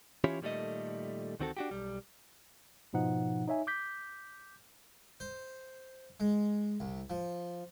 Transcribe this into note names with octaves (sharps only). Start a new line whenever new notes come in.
E3 C#4 E4 F4 G4 C#5
A#2 D#3 G3 A3 A4 D#5
D2 D#3 C4 F#4 A4
D4 F#4 G4
B1 G3
G#2 B2 F3 D#4 F#5
D#4 C#5 E5 G#5
D6 G6 B6
C5
G#3
C2
F3